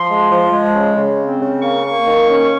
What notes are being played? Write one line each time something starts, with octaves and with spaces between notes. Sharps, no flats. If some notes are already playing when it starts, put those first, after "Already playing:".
Already playing: F3 C6
G#3
F3
G#3
C#3
C#3
C4
C#3
A#3 C#6
A#3
D#3
C#4